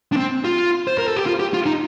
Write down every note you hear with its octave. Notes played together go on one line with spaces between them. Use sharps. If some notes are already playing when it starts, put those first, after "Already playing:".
D4
C4
F4
C5
A#4
A4
G4
F4
G4
F4
D#4